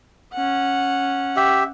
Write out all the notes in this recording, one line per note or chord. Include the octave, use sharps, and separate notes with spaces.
C#4 F#5
G4 E5